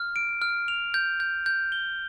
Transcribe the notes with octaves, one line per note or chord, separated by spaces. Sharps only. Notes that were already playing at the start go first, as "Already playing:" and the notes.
Already playing: F6
D7
F6
F7
G6
G6
G6
G7